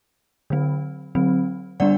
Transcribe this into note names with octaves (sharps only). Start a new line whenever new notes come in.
D3 F#3 C4
D3 F#3 C4
D3 G3 B3 D4 D5 F#5